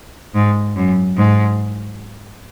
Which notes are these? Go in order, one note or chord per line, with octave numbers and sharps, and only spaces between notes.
G#2
F#2
G#2